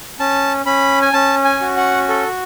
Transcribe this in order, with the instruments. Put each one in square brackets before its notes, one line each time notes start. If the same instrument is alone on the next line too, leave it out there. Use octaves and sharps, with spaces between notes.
[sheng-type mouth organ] C#4 A5
C#4 B5
G#5
C#4 A5
G#5
F#4
F#5
A4